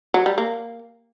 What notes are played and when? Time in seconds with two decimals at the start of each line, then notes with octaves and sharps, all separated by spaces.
0.14 F#3
0.26 G3
0.38 A#3